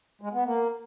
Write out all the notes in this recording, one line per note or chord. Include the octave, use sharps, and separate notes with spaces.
G#3
B3
A#3